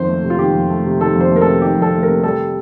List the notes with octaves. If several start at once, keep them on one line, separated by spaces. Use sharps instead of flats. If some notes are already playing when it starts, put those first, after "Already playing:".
Already playing: F2 D#3 C5
A3
C3
F4
D#3 G4
F2
A3
C3
D#3 A4
F2
C5
A3
A#4
A4
C3
D#3 G4
F2 A4
A3
C3 A#4
G3 A4